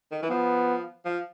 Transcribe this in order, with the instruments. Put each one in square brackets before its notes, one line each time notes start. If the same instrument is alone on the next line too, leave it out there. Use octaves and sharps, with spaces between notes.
[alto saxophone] D#3
E3
[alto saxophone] F3 [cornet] B3
[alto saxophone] F3